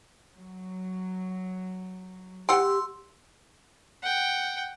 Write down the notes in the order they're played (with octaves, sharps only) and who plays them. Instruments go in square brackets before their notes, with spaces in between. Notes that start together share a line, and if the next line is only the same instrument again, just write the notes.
[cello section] F#3
[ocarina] G4 [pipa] F#5 G5 [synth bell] C6 E6
[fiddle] F#5 G5